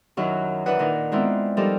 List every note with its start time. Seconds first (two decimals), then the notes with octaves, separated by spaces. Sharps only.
0.17 F#2 D#3 F#3 E4
0.66 E3 D4 E4 B4 F#5 D#6
0.79 A#2 D#3 D4 D#4
1.12 G#3 B3 C4 D4 E4 F4
1.57 F3 G3 D#4 A4 A#4 D5